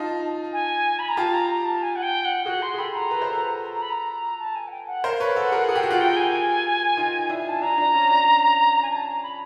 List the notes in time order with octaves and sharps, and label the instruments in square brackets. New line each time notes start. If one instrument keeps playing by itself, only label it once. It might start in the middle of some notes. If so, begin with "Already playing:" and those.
Already playing: [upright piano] D#4 F4 [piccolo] A5
[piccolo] G#5
B5
A#5
[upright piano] F4 G4 [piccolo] A5
[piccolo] A#5
A#5
A5
G#5
F#5
G5
F#5
[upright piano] F#4 G#4 [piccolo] F#5
[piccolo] C6
[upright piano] G#4
[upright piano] G4 A4 [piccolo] B5
[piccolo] A#5
[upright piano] B4
C5
A4 B4
[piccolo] A#5
B5
A#5
A5
G#5
F#5
G5
F#5
[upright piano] A#4 C5 [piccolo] F5
[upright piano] B4 C#5
[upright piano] A4 B4 [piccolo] F#5
[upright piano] G#4 A#4
[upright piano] G#4 [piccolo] F#5
[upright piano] G4
[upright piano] F#4 [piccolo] F#5
[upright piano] F4 G4
[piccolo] G5
G#5
[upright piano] D#4 F4
D4 E4
[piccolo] G#5
A5
[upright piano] D4 [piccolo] A#5
[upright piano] D4
C#4
D4
[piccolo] G#5
A5
A#5
B5